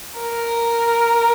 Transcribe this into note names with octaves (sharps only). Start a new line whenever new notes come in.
A#4